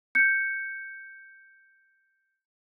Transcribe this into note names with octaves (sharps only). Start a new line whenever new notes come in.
G6 C#7